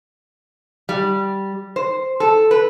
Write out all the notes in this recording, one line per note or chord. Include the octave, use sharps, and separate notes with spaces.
G3
C5
A4
B4